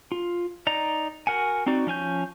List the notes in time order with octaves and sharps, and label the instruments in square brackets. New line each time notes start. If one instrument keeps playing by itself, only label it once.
[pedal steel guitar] F4
D#4 D5 A#5
F#4 A#4 F#5 G#5
C4 D#4 F#4 D5
F3 C#4 G#5 G6